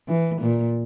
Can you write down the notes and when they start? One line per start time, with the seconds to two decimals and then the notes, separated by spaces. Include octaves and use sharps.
0.08 E3
0.41 A#2